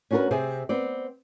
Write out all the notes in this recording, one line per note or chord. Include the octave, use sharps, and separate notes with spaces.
C#4 D4 F#4 G#4 A#4 B4
C3 C4 G#4
B3 C4 D5